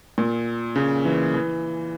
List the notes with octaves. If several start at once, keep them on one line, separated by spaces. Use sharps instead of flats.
A#2
C#3
E3
E3